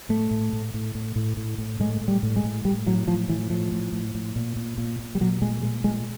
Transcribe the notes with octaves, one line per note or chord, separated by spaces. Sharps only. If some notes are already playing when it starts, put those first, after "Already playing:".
A2 A3
A2
A2
A2
A2
A2
A2
A2
A2 G#3
A2
G3
A2
G#3
A2
A2 G3
A2 F#3
A2 F3
A2 E3
A2 F3
A2
A2
A2
A#2
A#2
A#2
A#2
G3
A#2 F#3
A#2 G#3
A#2 G#3
A#2 G#3